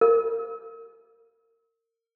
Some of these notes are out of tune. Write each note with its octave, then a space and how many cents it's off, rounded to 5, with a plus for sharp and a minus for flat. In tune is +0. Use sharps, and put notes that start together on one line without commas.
A#4 -30